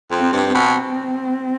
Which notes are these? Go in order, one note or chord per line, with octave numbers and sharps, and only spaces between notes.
F2
C4
G2
C4
B2